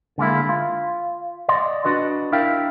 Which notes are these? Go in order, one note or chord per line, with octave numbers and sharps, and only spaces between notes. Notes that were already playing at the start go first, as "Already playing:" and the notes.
D3 G#3 A#3 E4
F4
D5 D#5 C6
D4 F#4 B4 D#5
D4 E4 A#4 E5 F5 G5